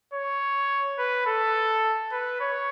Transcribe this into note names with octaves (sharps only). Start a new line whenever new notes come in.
C#5
B4
A4
B4
C#5